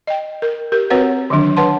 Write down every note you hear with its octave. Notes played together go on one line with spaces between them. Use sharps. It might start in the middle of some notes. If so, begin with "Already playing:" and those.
D#5 G5
A#4
G4 A#4
C4 F#4 B4 C#5 F#5
D3 D#3 F#3 D4
B4 C#5 F#5 A5 C6